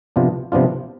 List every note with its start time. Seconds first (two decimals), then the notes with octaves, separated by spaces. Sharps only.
0.16 C3 F3 B3 D4 F4
0.52 C3 F3 B3 D4 F4